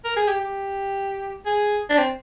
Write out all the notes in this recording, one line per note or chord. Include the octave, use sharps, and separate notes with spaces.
A#4
G#4
G4
G4
G#4
D4
C4